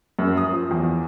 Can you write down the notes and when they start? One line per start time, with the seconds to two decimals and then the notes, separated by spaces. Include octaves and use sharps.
0.19 F#2
0.37 D#6
0.53 F3
0.71 E2